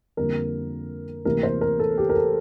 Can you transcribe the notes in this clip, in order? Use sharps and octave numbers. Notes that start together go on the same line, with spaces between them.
F2 D3 G3 A#3 A#4
D2 C3 E3 A#3 A#4
C5
A#4
A4
G4
A#4
A4